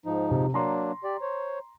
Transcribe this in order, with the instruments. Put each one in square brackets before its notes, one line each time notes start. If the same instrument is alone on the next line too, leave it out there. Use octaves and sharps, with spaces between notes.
[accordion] G#2 F3 D#4
[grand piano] C3
[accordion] F#3 A#3 D4 [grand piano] A#5 C6
[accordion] G4 D5
C5 C#5